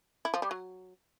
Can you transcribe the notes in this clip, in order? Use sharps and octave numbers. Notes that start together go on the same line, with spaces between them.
E4
F3
G3
F#3